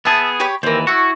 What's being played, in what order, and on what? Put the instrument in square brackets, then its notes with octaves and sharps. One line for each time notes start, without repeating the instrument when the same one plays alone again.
[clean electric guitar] B3 G#4 [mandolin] E5 A5
[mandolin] G4 C#5 B5
[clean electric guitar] D#2 E3 [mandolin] C4 A#4
[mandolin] E4 C#6 [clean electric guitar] F#4